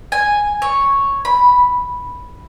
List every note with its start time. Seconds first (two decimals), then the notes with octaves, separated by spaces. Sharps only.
0.12 G#5
0.62 C#5
1.25 B5